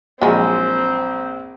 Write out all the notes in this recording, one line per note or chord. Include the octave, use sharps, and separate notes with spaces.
A#1 F#3 G#3 C4